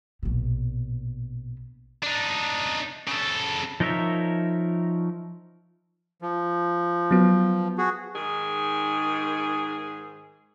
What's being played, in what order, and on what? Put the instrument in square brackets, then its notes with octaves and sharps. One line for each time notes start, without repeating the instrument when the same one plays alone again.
[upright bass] A#1 B2
[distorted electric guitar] D4 D#4
C#3 A4
[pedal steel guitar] F3 D#4 A#4 C#5 E5
[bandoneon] F3
[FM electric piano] F#3 B3
[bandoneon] F#4 G#4
[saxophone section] G#2 D#3 G#4